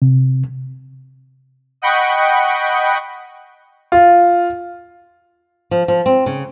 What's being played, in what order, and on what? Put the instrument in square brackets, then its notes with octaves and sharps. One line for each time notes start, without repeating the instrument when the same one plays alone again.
[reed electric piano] C3
[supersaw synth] D#5 F#5 G5 B5 C#6
[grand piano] F4
[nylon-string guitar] F3
F3
C4
C#3